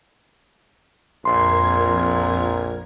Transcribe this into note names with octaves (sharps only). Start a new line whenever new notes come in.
A#1 F2 A#4 C6 G#6